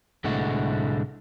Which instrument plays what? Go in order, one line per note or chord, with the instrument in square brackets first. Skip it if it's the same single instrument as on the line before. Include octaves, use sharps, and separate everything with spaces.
[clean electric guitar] C2 A2 D3 G#3 A3 F#4